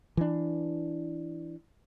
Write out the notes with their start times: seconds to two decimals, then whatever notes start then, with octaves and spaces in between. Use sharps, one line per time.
0.17 E3 D4